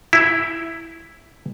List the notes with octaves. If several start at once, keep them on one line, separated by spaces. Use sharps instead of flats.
E4